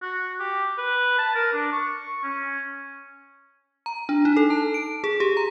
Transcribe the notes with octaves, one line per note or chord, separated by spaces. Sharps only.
F#4
G4
B4
A5
A#4
D4
C#6
C#4
A#5
D4
D#4
A4
A5
D7
G#4
G4
A#5